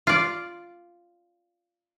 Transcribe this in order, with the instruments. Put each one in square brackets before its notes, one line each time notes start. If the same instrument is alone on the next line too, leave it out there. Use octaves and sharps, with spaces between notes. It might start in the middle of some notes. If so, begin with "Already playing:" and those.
[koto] F4 D5